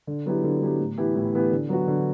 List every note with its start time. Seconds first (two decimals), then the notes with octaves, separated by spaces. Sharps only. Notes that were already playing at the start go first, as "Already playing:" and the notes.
0.07 D3
0.26 F#3 B3 E4 G4
0.44 D3
0.62 F#3 B3 E4 G4
0.80 A2
0.97 E3 B3 E4 G4
1.16 A2
1.33 E3 B3 E4 G4
1.51 D3
1.69 F#3 B3 F#4
1.88 D3